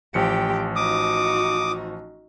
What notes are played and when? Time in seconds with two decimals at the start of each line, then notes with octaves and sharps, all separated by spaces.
0.14 A1 F3 G4 G5 C#7
0.76 D#4 F#4 D6 D#6